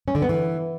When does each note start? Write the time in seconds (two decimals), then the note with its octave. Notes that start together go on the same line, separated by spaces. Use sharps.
0.08 C#4
0.15 D3
0.22 B3
0.29 E3